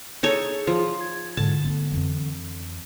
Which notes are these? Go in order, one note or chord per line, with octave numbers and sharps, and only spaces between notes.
D#4 G#4 A4 C#5
F3
G#6
G#2 D3 A5
A3 B3
F2 E3